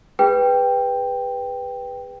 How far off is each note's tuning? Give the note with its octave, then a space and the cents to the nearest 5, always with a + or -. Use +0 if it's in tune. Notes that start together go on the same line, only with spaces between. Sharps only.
G#4 -30 B4 +0 G5 +5